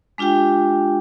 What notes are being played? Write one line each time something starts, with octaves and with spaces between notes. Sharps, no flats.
G#3 D4 F4 G4 G5